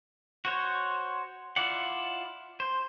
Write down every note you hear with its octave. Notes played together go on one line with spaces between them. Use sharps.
F#4 C5 C#5
E4 F4 D5 F#5
C5